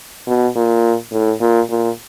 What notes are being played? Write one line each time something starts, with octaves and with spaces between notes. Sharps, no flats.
B2
A#2
A2
A#2
A#2